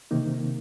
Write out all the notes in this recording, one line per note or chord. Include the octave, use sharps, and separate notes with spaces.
C3 D#3 A#3 D#4